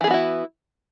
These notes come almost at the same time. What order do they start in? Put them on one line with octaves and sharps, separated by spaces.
E3 G#4 B3 F#4 E4